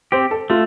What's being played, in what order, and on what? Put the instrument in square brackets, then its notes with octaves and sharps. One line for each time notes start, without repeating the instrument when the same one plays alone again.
[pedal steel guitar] C4 G4 [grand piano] C5
[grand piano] A4
[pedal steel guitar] A3 [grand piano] F4